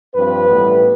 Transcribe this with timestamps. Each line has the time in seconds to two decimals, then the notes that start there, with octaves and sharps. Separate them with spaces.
0.14 G2 F3 C4 B4
0.49 A1 A2 G3 B3